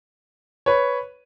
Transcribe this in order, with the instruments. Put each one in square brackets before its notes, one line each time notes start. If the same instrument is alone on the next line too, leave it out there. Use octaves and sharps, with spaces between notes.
[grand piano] B4 C#5